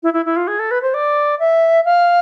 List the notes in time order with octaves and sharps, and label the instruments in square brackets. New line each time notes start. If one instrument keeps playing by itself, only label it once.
[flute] E4
E4
E4
F4
G#4
A4
B4
C5
D5
E5
F5